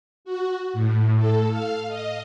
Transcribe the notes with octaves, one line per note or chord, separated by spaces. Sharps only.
F#4
A2
A4
F5
D#5